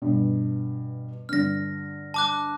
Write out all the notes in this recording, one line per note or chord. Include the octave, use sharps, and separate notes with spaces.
G2 B2
G2 D3 F6 A#6
A5 D6 F#6